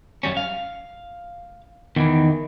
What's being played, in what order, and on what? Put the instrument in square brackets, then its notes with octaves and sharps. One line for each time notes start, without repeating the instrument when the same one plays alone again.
[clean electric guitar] F#2 G3 C#4
F5
[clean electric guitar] E2 E3 [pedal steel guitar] D#3